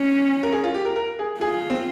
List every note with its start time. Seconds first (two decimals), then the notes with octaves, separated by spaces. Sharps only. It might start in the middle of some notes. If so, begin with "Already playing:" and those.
Already playing: C#4
0.43 A#4
0.52 G#4
0.64 F4
0.74 G4
0.85 A#4
0.96 A#4
1.19 G#4
1.40 F4 G#4
1.70 C4